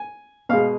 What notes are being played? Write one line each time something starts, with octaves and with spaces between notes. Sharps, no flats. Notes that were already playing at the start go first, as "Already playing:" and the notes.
Already playing: G#5
B2 G#3 F5